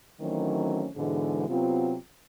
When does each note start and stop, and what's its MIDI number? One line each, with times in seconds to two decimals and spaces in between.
0.21 0.88 51
0.21 0.88 52
0.21 0.88 54
0.21 0.88 57
0.21 0.88 60
0.21 0.88 61
0.96 1.48 44
0.96 1.48 47
0.96 1.48 50
0.96 1.48 52
0.96 1.48 56
1.48 1.96 48
1.48 1.96 54
1.48 1.96 59
1.48 1.96 60
1.48 1.96 65